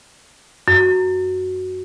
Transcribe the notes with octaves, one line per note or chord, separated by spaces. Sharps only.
F#2